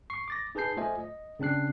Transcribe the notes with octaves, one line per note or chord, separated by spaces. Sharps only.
C#6 C7
D6 A6 A#6
D#4 G#4 B4 A5 G6 C7
A3 F4 C5 D#5 E5 G#5
D#5
C#3 C4 D4 F#6 C7